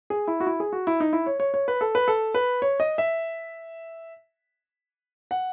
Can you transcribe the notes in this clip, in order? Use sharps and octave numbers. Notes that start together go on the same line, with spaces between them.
G#4
E4
F#4
E4
G#4
F#4
E4
D#4
E4
C#5
C#5
C#5
B4
A4
B4
A4
B4
C#5
D#5
E5
F#5